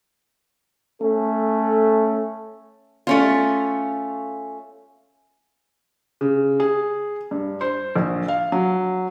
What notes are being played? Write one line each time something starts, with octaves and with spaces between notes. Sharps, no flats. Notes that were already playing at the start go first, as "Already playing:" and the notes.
A3 C#4 A4
A3 C#4 F4
C#3
G#4
G2
C5
A#1
F5
F#3